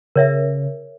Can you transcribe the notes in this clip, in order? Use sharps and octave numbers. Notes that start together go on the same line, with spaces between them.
C#3 A#4 C#5 E5